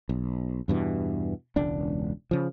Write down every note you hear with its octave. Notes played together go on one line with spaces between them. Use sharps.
B1
E2 G2 B2 E3
E1 C#2 D4
C#3 F3